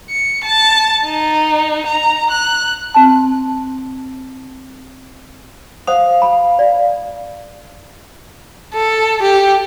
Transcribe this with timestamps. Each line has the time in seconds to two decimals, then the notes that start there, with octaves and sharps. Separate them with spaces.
0.10 C#7
0.44 A5
1.03 D#4
1.87 A#5
2.31 F#6
2.94 C4 A5
5.87 C5 F5 F#5 D#6
6.22 B5
6.59 D5
8.74 A4
9.22 G4